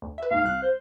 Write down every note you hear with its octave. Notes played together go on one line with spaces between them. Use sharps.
D2
B4 E5
D#2 G#2 F5
C2 F#6
C5